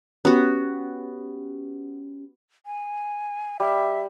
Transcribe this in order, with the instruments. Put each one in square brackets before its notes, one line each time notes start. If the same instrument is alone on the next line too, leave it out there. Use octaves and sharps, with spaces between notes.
[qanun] B3 F#4 [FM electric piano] C#4 G4
[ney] G#5
[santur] G3 [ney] E5